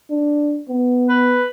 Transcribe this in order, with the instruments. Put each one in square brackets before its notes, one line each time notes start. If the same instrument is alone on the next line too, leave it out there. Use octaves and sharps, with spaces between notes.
[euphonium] D4
B3
[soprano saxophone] B4